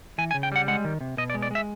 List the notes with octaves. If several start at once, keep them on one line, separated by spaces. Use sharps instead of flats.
E3 G#5
G#5
C#3
G5
G3 F#5
G#3 F#5
D#3
C3
B2 D#5
D5
G#3
D5
G#3 E5